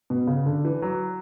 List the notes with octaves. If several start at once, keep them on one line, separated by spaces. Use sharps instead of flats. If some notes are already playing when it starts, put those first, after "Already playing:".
B2
C#3
D3
E3
F#3